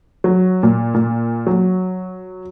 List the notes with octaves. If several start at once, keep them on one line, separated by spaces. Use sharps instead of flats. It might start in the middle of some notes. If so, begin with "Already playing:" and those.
F#3
A#2
A#2
F#3